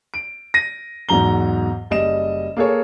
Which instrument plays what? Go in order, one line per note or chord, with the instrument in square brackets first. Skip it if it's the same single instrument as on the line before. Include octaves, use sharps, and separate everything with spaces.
[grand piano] D7
A#6 D#7
E2 G#2 F#3 A#5 G7
F#1 G3 D#5 E7
A#3 G#4 A4 C#5